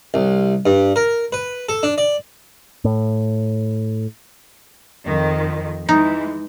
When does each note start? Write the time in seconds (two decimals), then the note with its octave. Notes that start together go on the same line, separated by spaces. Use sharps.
0.14 C2
0.66 G2
0.96 A#4
1.33 B4
1.69 A4
1.83 D4
1.98 D5
2.84 A2
5.06 F2 D#3
5.89 E3 G#3 D#4